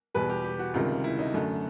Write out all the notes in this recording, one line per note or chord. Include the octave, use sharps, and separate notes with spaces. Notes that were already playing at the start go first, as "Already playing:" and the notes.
E2 B2 G3 B4
G4
G4
F#4
C#2 C3 D#3 G3 F4
E4
D#4
F#2 D3 F#3 A3